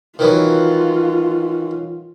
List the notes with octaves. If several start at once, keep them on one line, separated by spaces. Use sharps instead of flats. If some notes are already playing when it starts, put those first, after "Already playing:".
D#3 E3 F#3 F4